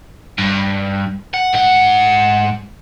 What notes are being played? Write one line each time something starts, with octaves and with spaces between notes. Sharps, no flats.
G2
F#5
G#2 F#5